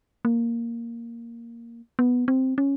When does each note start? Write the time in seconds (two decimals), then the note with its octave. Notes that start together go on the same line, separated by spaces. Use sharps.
0.25 A#3
1.99 B3
2.28 C4
2.58 C#4